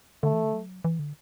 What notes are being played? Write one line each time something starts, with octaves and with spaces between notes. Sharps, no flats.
D3 A3
E3
D3
F#3
E3
D3